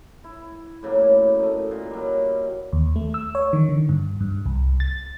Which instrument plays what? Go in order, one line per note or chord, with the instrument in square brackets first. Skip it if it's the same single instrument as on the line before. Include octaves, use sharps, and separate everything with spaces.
[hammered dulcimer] E4
A2 C#3 F#3 A#3
A3 D#4
A#2
F#3 G3
[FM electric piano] D#2
A3
E6
C#5
D#3
D3
G2
G2
C2
A6